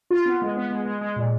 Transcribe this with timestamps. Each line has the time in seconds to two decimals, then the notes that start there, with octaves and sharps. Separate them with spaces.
0.11 F4
0.26 B3
0.42 G#3
0.57 B3
0.71 G#3
0.86 G#3
1.01 G#3
1.16 A#2